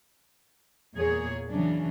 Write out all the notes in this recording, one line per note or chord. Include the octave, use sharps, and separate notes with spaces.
E2 A#2 A#3 G#4 C#5
C#3 E3 F#3 C#4 D4